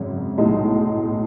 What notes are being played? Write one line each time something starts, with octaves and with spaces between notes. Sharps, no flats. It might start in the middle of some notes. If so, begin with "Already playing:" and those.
Already playing: G#1 F#2 C#3
B1 A2 G#3 D#4